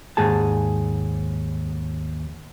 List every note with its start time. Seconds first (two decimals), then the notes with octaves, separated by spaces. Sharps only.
0.17 D#2 G#2 G#4 A5